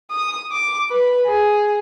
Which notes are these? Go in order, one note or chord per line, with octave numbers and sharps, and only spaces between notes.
D#6
D6
B4
G#4